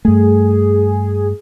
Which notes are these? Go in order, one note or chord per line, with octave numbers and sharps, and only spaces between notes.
G2 A3 G#4